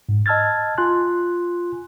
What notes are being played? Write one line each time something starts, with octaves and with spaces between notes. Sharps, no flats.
G#2
D#5 A5 E6 F6 G#6 A6
F4 G#5 C6 F#6